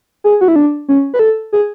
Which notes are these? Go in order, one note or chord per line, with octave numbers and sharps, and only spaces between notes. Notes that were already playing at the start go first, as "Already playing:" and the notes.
G#4
F#4
E4
D4
C#4
B4
A4
G#4